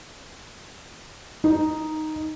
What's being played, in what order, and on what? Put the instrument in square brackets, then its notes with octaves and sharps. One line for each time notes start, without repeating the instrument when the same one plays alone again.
[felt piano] D#4